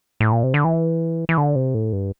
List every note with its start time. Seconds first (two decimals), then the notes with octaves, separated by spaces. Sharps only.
0.20 A2
0.32 A#2
0.43 C3
0.54 D3
0.64 E3
1.29 E3
1.38 D3
1.56 C3
1.75 A2
1.93 G2